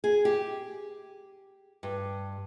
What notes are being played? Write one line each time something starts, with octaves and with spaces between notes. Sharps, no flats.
G#4
G4
G2